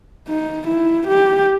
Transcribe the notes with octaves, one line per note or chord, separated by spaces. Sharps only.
D#4
E4
G4